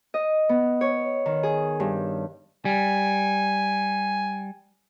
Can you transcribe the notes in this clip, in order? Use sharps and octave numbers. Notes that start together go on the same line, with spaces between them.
D#5
B3
C#5
D#3
G#4
G2
G3 G#5